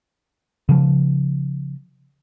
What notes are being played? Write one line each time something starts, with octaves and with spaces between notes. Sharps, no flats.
C#3 F3